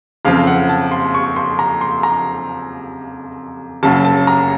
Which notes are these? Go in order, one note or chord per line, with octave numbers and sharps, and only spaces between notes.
F#1 F2 C#3 F3 C4 F5
F#5
A5
C6
C#6
C6
A#5
C6
A#5
F#1 F#2 C#3 F#3 A5
A5
A#5